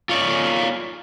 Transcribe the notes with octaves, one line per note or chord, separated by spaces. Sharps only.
F4 C#5 D5